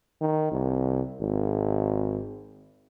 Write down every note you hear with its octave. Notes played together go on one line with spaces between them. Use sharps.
D#3
C2
G#1